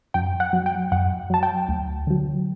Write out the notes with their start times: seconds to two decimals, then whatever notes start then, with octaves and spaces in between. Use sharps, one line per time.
0.14 F#2 G5
0.40 F#5
0.53 F#3
0.66 G5
0.92 F#2 F#5
1.30 F#3 A5
1.43 G5
1.68 D2
2.07 D3 F#3